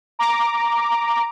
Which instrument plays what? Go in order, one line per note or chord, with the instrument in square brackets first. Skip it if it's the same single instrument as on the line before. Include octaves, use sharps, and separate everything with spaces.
[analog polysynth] A#5 D6